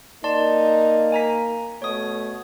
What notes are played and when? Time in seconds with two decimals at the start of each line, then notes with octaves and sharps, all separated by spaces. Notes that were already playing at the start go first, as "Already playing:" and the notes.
0.24 A#3 D#4 D5 A5 C6
1.12 G#5 A#5 B6
1.82 B2 A3 C#5 D#6